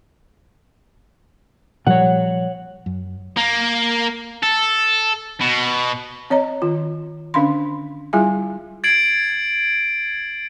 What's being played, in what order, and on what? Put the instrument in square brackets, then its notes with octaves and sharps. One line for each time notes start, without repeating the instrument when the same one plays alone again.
[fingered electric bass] A#2 F3 G3 [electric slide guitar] C#5 F#5
[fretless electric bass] F#2
[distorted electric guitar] A#3
A4
B2
[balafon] C4 C#5 D#5 A#5
D#3 F4
D3 C#4 D4 F5 B5 C6
G3 E4 F4 G#4 E5 G#5
[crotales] G#6 A6 C7 D7 F#7